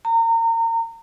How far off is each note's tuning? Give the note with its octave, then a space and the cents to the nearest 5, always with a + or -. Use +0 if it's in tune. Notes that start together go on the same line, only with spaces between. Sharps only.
A#5 -30